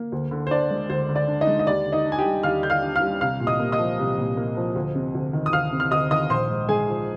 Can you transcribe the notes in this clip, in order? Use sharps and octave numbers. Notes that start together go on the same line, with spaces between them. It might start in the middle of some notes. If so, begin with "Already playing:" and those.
Already playing: A#3
D2
D3
C5
D4 D5
G#3
D2 C5
D3
D5
D4
D#4 D#5
G#3
D#5
D#2 D5
D3
D#4 D#5
D4
G#5
G4 G5
G3
D#2 F5 F6
D3 G6
F5 F6
D4
F5 F6
G3
C2 F5 F6
A#2
D#5 D#6
A#3
D#5 D#6
F3
C2
A#2
A#3
F3
D2
C3
D2
D#3
D#6
D2 F5 F6
C3
F6
D2 D#5 D#6
D#3 D#5 D#6
A#1 C5 C6
G#2
G#3 G#4 G#5
F3